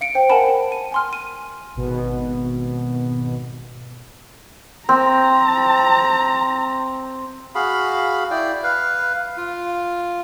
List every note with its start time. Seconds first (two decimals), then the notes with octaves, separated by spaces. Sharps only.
0.01 F5 C#7 D7
0.15 C5 G5
0.29 A#4 F#5 G#5 A5 B5
0.72 D#7
0.92 G#5 C6 F6
1.13 D#7
1.75 G#1 B2
4.89 C4 A#5
7.55 F#4 G#4 F5 B5
8.31 E4 D5 G5
8.63 B4 F5
9.37 F4